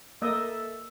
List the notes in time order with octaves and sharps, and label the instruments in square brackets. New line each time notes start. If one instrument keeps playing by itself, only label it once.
[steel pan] A#3 D#5 [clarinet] A4 [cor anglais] E5